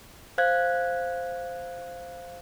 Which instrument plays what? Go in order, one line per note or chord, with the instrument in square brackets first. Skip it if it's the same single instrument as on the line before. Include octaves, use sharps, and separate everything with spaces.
[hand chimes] C5 F5 F#6 G#6